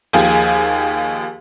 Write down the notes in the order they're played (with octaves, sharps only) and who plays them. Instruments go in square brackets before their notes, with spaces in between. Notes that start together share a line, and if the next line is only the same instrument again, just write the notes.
[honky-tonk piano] D#2 F3 A#3 G4 G#4 G#5